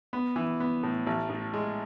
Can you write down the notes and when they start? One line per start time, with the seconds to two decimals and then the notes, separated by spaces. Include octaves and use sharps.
0.13 B3
0.36 E3
0.60 B3
0.83 A2
1.06 A1
1.29 A2
1.54 G#3